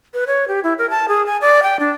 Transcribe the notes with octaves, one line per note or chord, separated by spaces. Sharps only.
B4
C#5
G4
E4
A#4
A5
G#4
G#5
D5
G5
D4